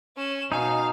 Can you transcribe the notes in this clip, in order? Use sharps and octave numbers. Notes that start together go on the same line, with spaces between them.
C#4 E7
B2 D#4 F5 G#5